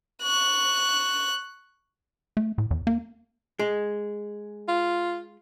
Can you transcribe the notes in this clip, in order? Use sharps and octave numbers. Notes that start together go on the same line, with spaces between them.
C#6 F#6
A3
A2
E2
A#3
G#3
F4